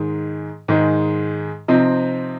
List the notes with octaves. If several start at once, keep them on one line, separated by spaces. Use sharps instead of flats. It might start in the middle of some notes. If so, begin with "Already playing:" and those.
Already playing: G#2 D#3 G#3
G#2 D#3 G#3
C3 F3 C4 D#4